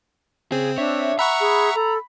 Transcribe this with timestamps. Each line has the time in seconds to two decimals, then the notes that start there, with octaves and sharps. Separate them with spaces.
0.52 C#3 C4 G#4
0.78 D4 C#5 E5
1.19 E5 F#5 A#5 B5 C#6
1.40 G#4
1.75 A4